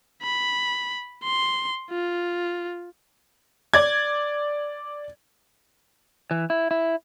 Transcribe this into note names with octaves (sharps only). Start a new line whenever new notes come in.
B5
C6
F4
D5 G#6
E3
E4
E4